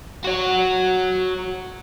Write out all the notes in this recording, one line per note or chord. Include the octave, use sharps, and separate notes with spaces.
F#4 C#5